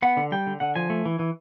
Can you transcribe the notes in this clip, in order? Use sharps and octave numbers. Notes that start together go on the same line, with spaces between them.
B3 F#5
D3
G3 G5
D3
D3 F#5
F3 G#5
A3
E3
E3